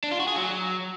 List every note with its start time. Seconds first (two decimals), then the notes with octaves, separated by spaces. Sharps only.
0.03 D4
0.12 F4
0.20 F#4
0.28 G#4
0.36 F#3